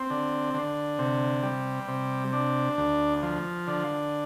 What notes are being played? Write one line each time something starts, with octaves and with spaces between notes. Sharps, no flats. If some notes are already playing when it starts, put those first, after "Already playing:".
Already playing: C4
D3
D3
C3
G3
C3
D4
D2
F3
D3